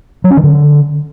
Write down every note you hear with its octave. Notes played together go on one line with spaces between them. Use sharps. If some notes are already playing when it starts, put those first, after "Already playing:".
F#3
C#4
D#3
D3